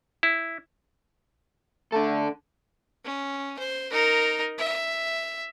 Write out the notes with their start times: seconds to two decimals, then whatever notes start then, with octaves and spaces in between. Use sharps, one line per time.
0.23 E4
1.92 A3 D4 A4
3.05 C#4
3.59 C5
3.92 D#4 A#4
4.58 E5